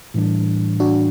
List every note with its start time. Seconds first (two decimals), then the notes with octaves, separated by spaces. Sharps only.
0.14 A2 E3 G3 D4
0.80 D4 F#4